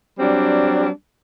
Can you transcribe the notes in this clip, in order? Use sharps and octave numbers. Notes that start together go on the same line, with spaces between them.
F#3 G3 C4 D4